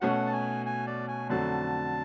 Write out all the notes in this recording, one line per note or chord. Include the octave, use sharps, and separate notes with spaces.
B2 A3 C#4 F#4 F#5
A5
G#5
G#5
D5
G#5
F2 D3 F#3 A3 A5